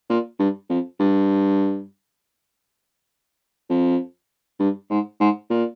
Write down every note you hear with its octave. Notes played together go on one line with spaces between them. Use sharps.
A#2
G2
F2
G2
F2
G2
G#2
G#2
A#2